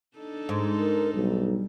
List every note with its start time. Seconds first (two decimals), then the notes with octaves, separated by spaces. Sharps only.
0.17 D4 D#4 A4
0.49 G#2
0.79 A#4
1.15 B1 G3